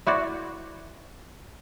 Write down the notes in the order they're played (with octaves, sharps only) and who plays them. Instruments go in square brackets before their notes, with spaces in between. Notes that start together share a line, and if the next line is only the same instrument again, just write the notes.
[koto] E4 F#4 C5 D5